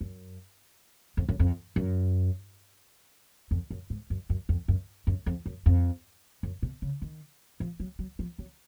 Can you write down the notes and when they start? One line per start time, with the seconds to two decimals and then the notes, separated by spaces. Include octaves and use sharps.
0.01 F#2
1.17 F2
1.29 F#2
1.40 F2
1.76 F#2
3.51 F2
3.70 F#2
3.90 G#2
4.10 F#2
4.30 F#2
4.49 F2
4.68 F#2
5.07 F#2
5.26 F2
5.46 F#2
5.66 F2
6.43 F#2
6.63 B2
6.82 C#3
7.02 D#3
7.60 F3
7.80 F#3
7.99 F#3
8.19 F3
8.39 F#3